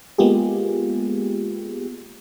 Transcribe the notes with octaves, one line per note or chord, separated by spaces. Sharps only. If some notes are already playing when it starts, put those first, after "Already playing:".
G#3 A#3 B3 F4 G4 G#4